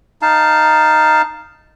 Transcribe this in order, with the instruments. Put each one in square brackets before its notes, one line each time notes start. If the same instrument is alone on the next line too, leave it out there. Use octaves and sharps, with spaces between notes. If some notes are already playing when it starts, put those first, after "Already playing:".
[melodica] D#4 F5 A5